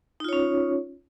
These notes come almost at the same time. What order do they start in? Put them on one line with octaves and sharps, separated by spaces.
D#4 F4 C#5 C#4